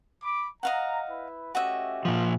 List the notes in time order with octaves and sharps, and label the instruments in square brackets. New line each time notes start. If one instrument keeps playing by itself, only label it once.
[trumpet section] B5 D6
[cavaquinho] D#5 F5 F#5 [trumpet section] A#5
[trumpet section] E4 B4
[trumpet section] A3 C#4 G4 [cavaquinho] F#4 D#5 E5
[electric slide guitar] A#2 F3